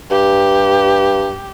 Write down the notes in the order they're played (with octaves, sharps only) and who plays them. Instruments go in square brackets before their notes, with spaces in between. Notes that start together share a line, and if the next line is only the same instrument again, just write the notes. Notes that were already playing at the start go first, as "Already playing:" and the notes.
[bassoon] G2 [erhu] G4